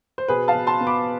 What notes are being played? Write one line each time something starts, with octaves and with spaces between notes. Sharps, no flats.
C5
B2 G#4 B4
F5 A5
B2
A5 C6
B3
B5 D6